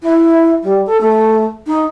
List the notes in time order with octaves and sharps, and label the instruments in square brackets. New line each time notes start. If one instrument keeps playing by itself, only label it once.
[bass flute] E4
G3
A4
A3
D#4